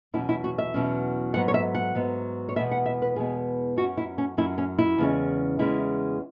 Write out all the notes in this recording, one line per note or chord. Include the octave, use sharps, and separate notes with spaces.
E2 B2 F#3 C#4 E4
E4
F#4
E5
E2 B2 F#3 C#4
G#2 F#3 B3 F#5
C#5
E5
F#5
G#2 F#3 B3
C#5
E2 B2 G#3 B3 E5
F#5
E5
B4
E2 B2 G#3 B3 G#4
F#2 F#3 C#4 F#4
E4
C#4
F#2 F#3 C#4 E4
C#4
E4
E2 C#3 G#3 C#4
E2 C#3 G#3 C#4 E4